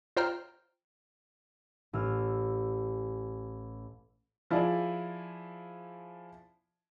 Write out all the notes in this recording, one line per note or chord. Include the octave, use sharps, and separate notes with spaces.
F4 C5 G5 A#5 F6
A1 E6 F6
F3 E4 G#4 D5